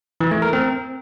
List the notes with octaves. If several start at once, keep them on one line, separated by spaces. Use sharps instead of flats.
E3
A3
A#4
C4